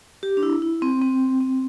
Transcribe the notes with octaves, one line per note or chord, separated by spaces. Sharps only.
G4
D4
E4
E4
C4
C4
C4